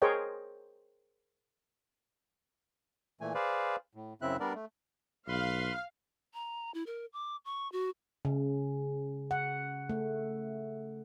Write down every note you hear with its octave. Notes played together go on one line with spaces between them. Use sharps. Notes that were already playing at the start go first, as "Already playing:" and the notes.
G#4 A#4 C5 C#5 D#5 G5
A#2 E3 A3 G#5
G#4 B4 C5 D5 F5
A2
F#2 C#3 C4 E4 E5 F#6
G3 B3 D4 A#4 D5
A3
B1 B4 F5 C6
A#5
E4
A#4
D6
C#6
F#4
C#3
F#5
A3